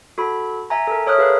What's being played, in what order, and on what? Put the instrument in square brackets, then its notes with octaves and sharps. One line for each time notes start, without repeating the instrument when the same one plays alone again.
[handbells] F#4 A4 B5
E5 G#5 A#5
A4 A#4
A4 C#5 E5 D#6 F6 F#6
G#4 A#4 B4 F5